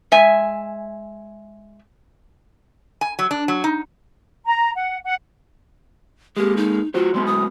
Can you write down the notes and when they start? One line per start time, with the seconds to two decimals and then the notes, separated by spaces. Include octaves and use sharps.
0.12 G#3 E5 G#5
3.01 G#5
3.19 F#3
3.31 D4
3.48 F#3
3.64 D#4
4.45 A#5
4.74 F#5
5.03 F#5
6.37 G#3 A#3 G4
6.57 D#4
6.94 F#3 F4 F#4 C5
7.14 F#3 G#3 B3 C6
7.26 D#6